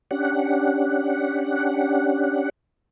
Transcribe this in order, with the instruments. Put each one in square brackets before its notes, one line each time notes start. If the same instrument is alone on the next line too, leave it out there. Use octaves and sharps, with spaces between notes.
[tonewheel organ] C#4 D4 G4 F#5